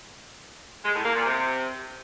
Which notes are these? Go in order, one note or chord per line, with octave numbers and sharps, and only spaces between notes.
G#3
A2
A#3
A#2
C3